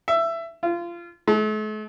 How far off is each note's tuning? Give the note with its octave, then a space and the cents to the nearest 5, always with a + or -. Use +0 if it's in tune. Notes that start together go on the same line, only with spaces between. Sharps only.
E5 +15
F4 -25
A3 -45